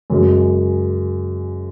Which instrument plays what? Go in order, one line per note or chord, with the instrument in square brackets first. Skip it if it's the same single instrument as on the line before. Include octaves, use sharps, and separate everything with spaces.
[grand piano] F#2 C#3 G#3 C#4